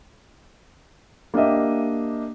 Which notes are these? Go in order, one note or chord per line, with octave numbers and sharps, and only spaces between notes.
A#3 D4 G4 D#5 E5